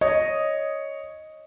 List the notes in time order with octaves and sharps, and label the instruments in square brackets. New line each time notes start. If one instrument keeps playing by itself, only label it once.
[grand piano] C#5 [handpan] D#5